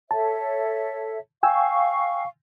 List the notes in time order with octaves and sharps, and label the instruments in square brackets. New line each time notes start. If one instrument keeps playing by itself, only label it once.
[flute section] A4 C#5 E5 [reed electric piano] A5
[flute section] F5 C#6 [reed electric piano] G5 G#5 E6